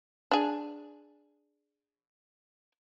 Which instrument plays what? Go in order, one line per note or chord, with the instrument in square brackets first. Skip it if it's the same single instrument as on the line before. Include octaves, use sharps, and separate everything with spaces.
[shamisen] D4 G#4